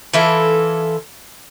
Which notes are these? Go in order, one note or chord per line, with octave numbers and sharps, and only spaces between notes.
E3 E4 F4 A4